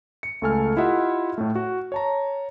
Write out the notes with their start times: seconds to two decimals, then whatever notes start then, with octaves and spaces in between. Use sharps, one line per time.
0.23 C#7
0.42 C#2 A3 A4 G#5 F6
0.77 E4 F4 G4 D#5 E5 F#5
1.38 A2 A3
1.55 F#4
1.92 C#5 A5 A#5